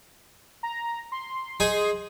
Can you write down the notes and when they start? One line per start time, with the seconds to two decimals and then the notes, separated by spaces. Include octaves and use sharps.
0.63 A#5
1.12 C6
1.60 D#4 G#4